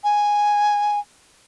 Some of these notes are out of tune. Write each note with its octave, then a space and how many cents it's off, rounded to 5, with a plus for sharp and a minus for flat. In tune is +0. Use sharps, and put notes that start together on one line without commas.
G#5 -5